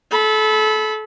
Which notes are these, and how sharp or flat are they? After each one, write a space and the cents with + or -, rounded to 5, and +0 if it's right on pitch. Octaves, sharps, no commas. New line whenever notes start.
A4 -30 B5 +0